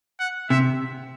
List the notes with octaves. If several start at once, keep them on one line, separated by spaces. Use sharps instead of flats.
F#5
C3 E5